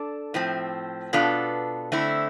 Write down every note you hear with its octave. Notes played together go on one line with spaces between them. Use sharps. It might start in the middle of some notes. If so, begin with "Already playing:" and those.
Already playing: D4 A4 D5
A2 F3 C4
B2 B3 D4 F4 A4
D3 A3 C4 E4